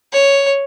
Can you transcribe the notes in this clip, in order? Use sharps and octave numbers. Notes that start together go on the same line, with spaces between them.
C#5